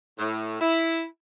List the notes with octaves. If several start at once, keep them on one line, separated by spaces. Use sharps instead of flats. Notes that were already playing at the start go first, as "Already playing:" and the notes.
A2
E4